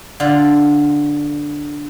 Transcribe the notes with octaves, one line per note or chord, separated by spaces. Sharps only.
D3 F4